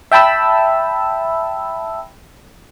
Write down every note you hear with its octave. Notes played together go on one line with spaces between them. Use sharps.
E5 G5 A5 B5 E6